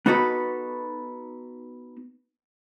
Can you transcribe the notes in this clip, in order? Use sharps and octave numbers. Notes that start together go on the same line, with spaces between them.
B3 D#4 F#4 A4 B4